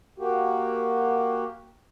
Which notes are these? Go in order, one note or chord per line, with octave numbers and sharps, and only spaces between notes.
A#3 F#4 G4